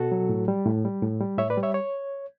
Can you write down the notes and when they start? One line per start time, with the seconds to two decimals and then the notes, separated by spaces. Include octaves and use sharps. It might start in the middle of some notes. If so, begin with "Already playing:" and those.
Already playing: B2 F#4 A4
0.12 F#3
0.29 A2
0.48 G3
0.66 A2
0.85 G3
1.02 A2
1.21 G3
1.38 A2 C#5 E5
1.50 B4 D5
1.57 G3
1.63 C#5 E5
1.74 C#5